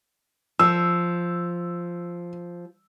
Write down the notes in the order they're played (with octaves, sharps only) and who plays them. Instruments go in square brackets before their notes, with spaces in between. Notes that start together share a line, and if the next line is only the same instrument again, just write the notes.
[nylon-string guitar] F3 [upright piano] E6